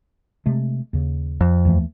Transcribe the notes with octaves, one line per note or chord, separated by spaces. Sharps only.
C3 G#3 A3
D#2 C#3
F2
D#2 E3 A3